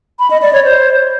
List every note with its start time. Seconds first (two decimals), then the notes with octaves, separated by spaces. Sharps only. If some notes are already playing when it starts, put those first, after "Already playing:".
0.19 B5
0.30 D#5
0.42 D5
0.53 C#5
0.64 C5